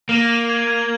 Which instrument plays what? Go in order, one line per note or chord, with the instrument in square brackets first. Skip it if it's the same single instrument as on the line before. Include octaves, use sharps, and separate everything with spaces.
[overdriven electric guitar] A#3 [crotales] D#7
[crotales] D#7
G#6
G#6